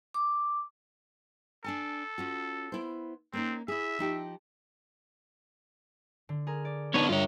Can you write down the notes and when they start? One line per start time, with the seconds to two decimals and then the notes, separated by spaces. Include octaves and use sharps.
0.14 D6
1.64 D4 A4 G#5 A5
2.18 C#4 F4 F#4
2.72 B3 E4 C5
3.33 A#3 C4 C#4 D#4
3.68 E4 G#4 E5
3.99 F3 D#4 G4
6.29 D3
6.47 G#4 A#4
6.65 D5
6.94 B3 D4 D#4 B4 C#5
7.09 G2 F4 A#4 C#5 E5